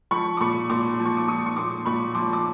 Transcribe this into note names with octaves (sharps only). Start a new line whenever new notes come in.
F3 B5 C#6
D6
A#2 B5 C#6
A#2 C6 D6
F3
C#6
D6
F3 C#6 D#6
C#6
A#2 C6 D6
A#2 B5 C#6
F3 C6 D6
D6